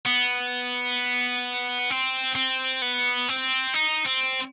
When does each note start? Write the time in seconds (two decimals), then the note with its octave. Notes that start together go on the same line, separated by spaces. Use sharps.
0.06 B3
1.90 C4
2.35 C4
2.82 B3
3.28 C4
3.74 D#4
4.06 C4